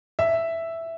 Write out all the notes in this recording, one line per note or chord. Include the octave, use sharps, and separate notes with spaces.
E5